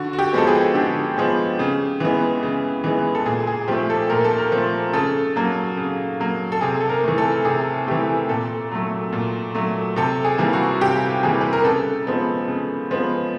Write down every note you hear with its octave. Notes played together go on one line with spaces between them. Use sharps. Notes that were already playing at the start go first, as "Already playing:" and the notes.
Already playing: D3 F#4
F#4
G4
F3 G#3 B3 A4
G#4
D3 G4
F3 G#3 B3
C#3
E3 G#3 B3
C#3
E3 G#3 B3
A4
A#2 G#4
G#4
F3 A3 G4
A4
A#2 A#4
A4
A#4
F3 A3
C#3 A4
F#3 A#3
C#3
F#3 A#3
A4
C3 G#4
A4
A#4
E3 A3
A4
C3 G#4
E3 A3 G4
A#2 A4
F#3 A3
A#2
F#3 A3
C3 A4
G#4
E3 G3 A#3
F#4
C3 G4
E3 G3 A#3 G#4
B4
A#4
C#3 A4
F3 G#3 B3
C#3
F3 G#3 B3